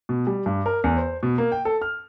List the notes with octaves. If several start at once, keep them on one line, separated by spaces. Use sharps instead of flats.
B2
G3
G2
A#4
E2
C5
B2
A#3
G5
A4
F6